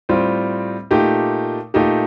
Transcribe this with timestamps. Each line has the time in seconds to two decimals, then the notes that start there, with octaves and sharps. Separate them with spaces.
0.09 A2 G3 C4 F4
0.91 A#2 A3 D#4 G4
1.74 A#2 A3 D#4 G4